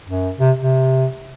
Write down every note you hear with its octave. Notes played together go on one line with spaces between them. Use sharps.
F#2
C3
C3